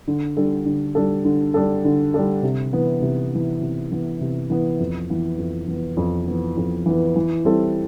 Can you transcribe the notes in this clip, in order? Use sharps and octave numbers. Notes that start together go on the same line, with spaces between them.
D3
G3 D4 A4
D3
G3 D4 A4
D3
G3 D4 A4
D3
G3 D4 A4
C3
E3 B3
C3
E3 B3
C3
E3 B3
C3
E3 B3
F2
E3 B3
F2
E3 B3
F2
E3 B3
F2
E3 B3
E3
G3 C4 E4 A4